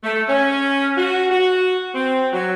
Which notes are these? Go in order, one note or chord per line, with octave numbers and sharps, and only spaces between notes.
A3
C#4
F#4
F#4
C4
F#3